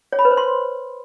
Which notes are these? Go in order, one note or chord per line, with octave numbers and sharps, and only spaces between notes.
C#5
B5
B4
C5
C6